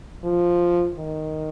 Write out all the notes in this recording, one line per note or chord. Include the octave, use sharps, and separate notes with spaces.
F3
D#3